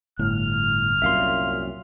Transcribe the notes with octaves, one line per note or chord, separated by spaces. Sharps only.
G1 A2 F6
C2 F#2 A#2 E5 F5 C6